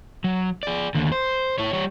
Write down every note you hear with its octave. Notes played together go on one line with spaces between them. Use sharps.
F#3
G#4 D5
D#2 D3
C5
E4 C#5
G3 C#5